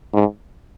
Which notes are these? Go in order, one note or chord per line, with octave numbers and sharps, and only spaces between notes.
G#2